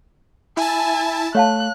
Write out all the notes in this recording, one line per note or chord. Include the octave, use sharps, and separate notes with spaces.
E4 G#5 A5
A3 C#5 F5 A5 F#6